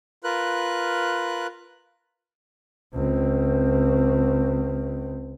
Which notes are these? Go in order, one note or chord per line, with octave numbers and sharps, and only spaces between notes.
F4 A#4 B4 F#6
C#2 C4